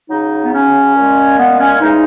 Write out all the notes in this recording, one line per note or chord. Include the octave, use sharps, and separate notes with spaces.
C#3 F#3 D#4
B3
C#4
A#2 G#3
B3
C#4
C#3 E3 G#3 D#4